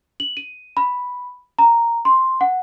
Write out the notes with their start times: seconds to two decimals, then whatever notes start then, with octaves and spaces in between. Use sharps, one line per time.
0.20 F#7
0.37 D#7
0.77 B5
1.59 A#5
2.05 C6
2.41 F#5